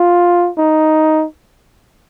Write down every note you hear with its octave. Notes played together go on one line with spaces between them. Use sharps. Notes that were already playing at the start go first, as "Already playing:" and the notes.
Already playing: F4
D#4